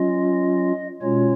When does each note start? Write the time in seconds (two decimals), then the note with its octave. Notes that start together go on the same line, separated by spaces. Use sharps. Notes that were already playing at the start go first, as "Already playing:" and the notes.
Already playing: F#3 C#4 F4 D#5
1.02 B2 G#3 C#4 F4 C#5